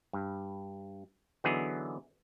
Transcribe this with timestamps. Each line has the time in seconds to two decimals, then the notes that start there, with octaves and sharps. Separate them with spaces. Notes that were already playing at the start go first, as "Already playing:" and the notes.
0.13 G2
1.44 D3 E3 F#3 B3 D#4 G#4